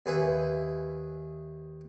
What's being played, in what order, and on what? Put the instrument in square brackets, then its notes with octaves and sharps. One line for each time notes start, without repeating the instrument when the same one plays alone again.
[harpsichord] D#2 G#4 B4 E5